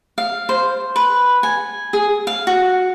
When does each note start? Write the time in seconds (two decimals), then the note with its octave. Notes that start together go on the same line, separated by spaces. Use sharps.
0.18 F5
0.49 C5
0.96 B4
1.43 G#5
1.93 G#4
2.27 F5
2.47 F#4